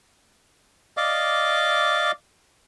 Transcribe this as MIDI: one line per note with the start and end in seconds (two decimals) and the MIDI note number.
0.97 2.11 74
0.97 2.11 75
0.97 2.11 77
0.97 2.11 86